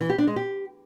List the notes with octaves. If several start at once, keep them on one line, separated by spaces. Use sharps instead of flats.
E3
G4
D4
G#3
G4